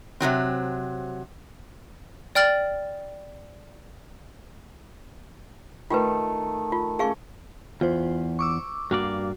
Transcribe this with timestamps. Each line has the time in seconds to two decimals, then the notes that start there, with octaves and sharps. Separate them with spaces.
0.20 C3 D#3 F#3 C4
2.35 D5 G5 F6 A6 F#7
5.90 D#3 A3 F4 B4
6.72 F4
6.99 A3 C#4 G#4 F5 C#6
7.81 E2 F4 C5
8.39 C#6 D6 E6
8.91 G2 A#3 F#4 D5